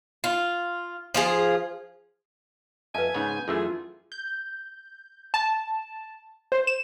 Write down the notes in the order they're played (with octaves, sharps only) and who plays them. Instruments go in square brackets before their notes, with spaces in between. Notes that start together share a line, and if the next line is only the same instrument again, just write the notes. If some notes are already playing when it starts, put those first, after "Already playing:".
[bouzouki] F4
F3 F4 G#4
[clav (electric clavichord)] F2 [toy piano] B4 A5 [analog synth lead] E5 [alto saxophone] G#5
[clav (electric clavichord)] G#2 C#3 B3 [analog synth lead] G6
[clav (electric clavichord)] F#2 E3 A3 [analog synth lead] F4 [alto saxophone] G#4
[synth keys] G6
A5
C5
E7